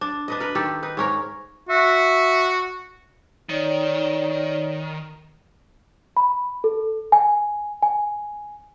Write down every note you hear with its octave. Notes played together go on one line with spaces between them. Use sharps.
D4
D4 B4 D#5
A#4 B4
D#3 G4 A4
D#4 B4
G#2 C#4 A#4
F#4 E5
D#3 D#4 C#5 D5
B5
A4
G#5
G#5